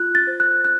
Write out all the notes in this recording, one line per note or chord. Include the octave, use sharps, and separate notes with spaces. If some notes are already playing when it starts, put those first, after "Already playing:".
Already playing: F4 F#6
A6
C5
F#6
F#6